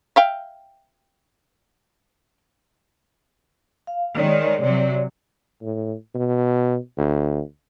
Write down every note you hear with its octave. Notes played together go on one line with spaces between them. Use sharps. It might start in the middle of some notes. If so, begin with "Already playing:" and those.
E5 F5 G5
F5
D#3 G#3 C#5 D5
C3 F#3
A2
B2
D2